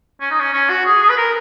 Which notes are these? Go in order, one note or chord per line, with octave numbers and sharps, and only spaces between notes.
C#4
D#4
C#4
C#4
F#4
G#4
G#4
B4
A#4